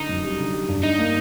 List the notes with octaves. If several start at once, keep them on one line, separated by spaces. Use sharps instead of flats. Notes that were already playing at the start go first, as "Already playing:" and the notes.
Already playing: D3 D#4
F#2
G3
D3
G3
G2
D4 D#4
A#3